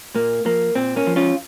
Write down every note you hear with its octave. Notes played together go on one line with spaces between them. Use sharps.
A#2 A#3
F3 A#3
A#2 C4
A#3 C#4
F3
C#4 F4